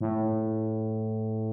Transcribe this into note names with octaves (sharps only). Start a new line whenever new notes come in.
A2